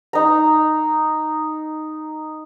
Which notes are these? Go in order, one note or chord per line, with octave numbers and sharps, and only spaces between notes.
D#4 A#5